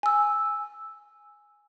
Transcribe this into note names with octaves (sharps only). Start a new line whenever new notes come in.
G#5 E6